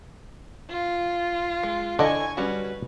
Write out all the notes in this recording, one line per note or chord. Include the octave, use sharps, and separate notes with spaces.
F4
G#3
D3 E4 D5 D#5 G#5 C#6
G3 C#4 F#4 B4